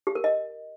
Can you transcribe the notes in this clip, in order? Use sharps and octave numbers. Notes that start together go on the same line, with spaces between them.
G4
A#4
D#5